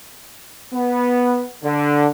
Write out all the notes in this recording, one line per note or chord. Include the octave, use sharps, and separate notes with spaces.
B3
D3